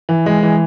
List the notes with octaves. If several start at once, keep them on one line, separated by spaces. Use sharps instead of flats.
E3
G#3
E3